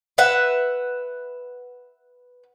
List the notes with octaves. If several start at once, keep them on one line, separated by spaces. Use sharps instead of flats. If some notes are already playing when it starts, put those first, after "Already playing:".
B4 E5 F#5